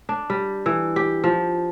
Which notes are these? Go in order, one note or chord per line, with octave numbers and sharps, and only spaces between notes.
D4
G3
E3
G4
F3